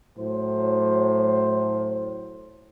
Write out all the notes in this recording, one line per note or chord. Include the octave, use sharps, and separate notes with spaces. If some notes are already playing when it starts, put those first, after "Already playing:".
A2 F#3 C5